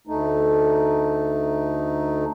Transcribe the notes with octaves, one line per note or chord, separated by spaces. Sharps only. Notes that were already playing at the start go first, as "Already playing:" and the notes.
D2 A3 D#4